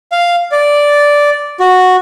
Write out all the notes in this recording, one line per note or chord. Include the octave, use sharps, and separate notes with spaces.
F5
D5
F#4